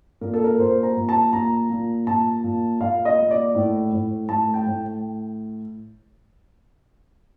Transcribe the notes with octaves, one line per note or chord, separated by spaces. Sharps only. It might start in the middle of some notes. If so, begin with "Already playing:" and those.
A#2 A#4
A4
A#4
A#2 C5
A#5
A#2
A5
A#2 A#5
A#2
A#2 A5
A#2
A#2 F5
D#5
A#2
D5
A2
A2
A2 A5
G5
A2